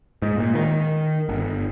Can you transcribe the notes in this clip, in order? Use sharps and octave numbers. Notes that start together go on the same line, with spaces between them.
G#2
A#2
D#3
G1